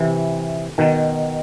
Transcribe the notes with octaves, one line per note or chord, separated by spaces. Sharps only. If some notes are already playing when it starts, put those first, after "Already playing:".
Already playing: C3 E3
B2 D#3